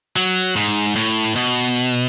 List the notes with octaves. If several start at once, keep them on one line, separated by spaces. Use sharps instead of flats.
F#3
G#2
A2
B2